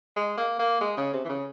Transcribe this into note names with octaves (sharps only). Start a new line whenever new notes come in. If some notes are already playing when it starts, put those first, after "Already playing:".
G#3
A#3
A#3
G#3
C#3
C3
E3
C#3